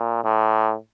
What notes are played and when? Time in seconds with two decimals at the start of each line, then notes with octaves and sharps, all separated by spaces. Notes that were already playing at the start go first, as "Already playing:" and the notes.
Already playing: A#2
0.24 A2